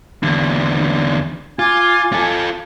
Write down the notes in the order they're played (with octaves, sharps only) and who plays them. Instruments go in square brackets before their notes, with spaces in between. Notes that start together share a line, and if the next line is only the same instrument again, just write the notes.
[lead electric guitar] E2 D3
[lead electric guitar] F4 [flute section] G#5 D6 G#6
[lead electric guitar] F4 A4